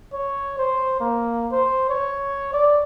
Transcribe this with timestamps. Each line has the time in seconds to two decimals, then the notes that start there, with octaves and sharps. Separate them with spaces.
0.13 C#5
0.58 C5
1.00 A#3
1.52 C5
1.90 C#5
2.53 D5